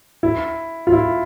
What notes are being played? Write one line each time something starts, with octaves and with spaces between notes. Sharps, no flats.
E4
F4
E4